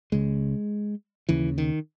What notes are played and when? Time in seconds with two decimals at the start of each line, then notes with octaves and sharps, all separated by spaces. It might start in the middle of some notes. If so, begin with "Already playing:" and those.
0.12 C#2 C#3 G#3
1.29 D#2 C#3 E3
1.58 D#3